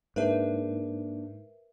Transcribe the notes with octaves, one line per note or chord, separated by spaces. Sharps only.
G#2 A#3 D4 A#4 B4 E5